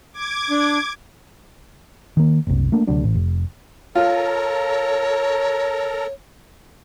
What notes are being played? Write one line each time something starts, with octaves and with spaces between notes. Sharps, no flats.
D6 G#6
D4
D#3 A#3
F#1 C2
A3 A#3 D4
D2 C3 F#3 D4
A1
F1
F4 A4 A#4 C#5 A#5